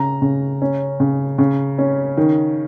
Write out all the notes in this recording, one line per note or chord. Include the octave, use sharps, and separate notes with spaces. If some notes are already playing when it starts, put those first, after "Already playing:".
Already playing: C#3 A#5
C#3
C#4
C#3
C#3
C#4
D#3